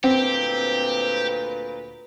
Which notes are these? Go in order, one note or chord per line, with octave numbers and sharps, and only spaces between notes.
D2 A#2 C4 G4 B4